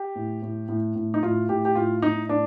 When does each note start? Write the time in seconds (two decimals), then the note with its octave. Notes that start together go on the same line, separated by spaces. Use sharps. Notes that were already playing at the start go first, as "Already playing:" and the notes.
Already playing: G4
0.15 A2
0.42 A2
0.69 A2
0.95 A2
1.14 D#4
1.23 A2 F4
1.49 A2 G4
1.65 G4
1.75 A2 F4
2.02 A2 D#4
2.29 A2 D4